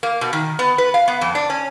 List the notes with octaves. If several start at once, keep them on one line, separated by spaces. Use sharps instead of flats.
A#3
B2
D#3
B3
B4
F5
B3
F2
D4
C#4